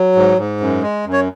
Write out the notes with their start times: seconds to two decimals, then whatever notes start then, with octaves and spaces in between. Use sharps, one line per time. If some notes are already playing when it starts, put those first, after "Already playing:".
Already playing: F#3
0.16 G#2
0.38 G#2
0.60 F#2
0.83 G#3
1.06 F#2
1.13 C#5